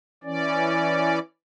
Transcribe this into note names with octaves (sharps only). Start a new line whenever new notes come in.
E3 C#4 D5